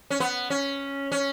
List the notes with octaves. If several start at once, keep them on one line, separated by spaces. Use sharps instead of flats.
C#4
B3
C#4
C#4